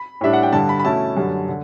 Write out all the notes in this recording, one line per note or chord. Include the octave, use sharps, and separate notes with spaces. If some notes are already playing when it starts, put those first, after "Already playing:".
Already playing: B5
A2 G3 D4 E5
F#5
G5
G2 D3 G3 A5
B5
B5
B2 A3 C#4 E4 A5
F#2 D3 G3
D3